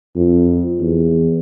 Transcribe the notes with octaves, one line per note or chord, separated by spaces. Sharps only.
F2
E2